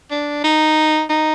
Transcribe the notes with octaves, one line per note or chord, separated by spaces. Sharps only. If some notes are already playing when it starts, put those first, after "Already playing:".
D4
D#4
D#4